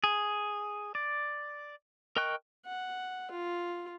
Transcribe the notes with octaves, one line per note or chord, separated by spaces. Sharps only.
G#4
D5
A#4 D#5 G5 C#6 F#6
F#5
F4